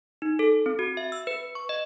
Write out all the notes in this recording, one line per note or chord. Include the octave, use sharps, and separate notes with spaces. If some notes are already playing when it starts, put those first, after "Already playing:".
D#4
A4
C4
F#4
E5
E6
B4
C#6
D#5